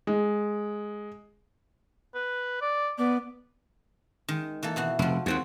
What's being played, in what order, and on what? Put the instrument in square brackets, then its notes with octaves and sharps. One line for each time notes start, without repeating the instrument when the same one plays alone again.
[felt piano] G#3
[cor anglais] B4
D5
[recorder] B3 [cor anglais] D5
[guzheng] D#3 G#3
E3 A#3 A4
B2 E3 F#4
[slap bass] F1 [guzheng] F3 F#4
[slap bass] D#2 [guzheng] G#3 C4 F#4